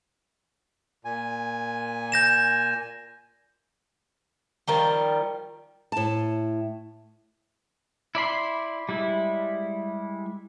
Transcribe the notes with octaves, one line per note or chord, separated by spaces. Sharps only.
A#2 G#5
G6 A#6 E7
D#3 F3 G3 A#4 A#5 G7
A2 A5
E4 D5 B5 C6
G3 G#3 E4